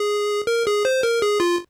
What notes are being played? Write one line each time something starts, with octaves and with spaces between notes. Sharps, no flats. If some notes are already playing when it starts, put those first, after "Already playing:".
Already playing: G#4
A#4
G#4
C5
A#4
G#4
F4